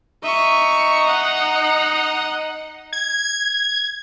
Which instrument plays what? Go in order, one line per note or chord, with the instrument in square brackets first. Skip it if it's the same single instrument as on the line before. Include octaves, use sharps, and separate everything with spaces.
[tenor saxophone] D#4 [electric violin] E5 C#6
[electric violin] D#5 F#5
[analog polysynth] G#6